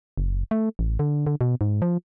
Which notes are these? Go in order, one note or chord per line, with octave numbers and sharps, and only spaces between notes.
F#1
A3
A1
D3
D3
B2
G#2
F3